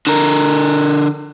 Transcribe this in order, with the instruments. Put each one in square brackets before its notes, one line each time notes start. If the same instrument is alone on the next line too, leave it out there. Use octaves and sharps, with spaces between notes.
[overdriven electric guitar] D3 A#4